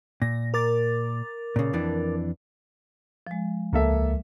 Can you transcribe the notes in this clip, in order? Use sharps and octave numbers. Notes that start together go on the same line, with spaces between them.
A#2 A#6
A#4 D6 A6
A#2 C#3
F2 E3 D4
F3 G#3
C#2 A#3 A4 E5